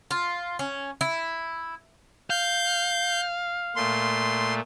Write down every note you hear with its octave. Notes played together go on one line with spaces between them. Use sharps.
F4
C#4
E4
F5 G6
A#2 A3 C6